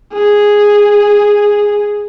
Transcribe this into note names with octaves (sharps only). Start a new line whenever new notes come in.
G#4